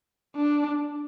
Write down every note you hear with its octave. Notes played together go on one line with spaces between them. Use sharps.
D4